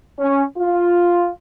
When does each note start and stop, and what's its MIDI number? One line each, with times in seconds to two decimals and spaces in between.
0.19 0.43 61
0.57 1.30 65